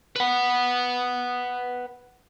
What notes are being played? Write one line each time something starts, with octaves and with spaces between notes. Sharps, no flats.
B4 F#5